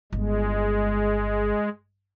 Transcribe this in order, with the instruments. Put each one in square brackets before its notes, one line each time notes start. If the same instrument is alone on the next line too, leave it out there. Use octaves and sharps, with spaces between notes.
[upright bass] G1 [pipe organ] G#3